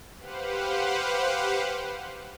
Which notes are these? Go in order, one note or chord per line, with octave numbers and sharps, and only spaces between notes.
G4 B4 C5 F5 F#5